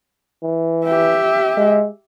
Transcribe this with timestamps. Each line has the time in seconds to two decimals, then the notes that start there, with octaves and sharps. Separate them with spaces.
0.43 E3
0.86 G4 E5
1.57 G#3